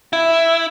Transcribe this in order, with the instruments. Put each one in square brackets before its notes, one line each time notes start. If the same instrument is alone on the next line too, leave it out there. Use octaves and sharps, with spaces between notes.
[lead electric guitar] E4